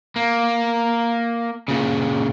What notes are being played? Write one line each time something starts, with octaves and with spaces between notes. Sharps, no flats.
A#3
A#2 C#3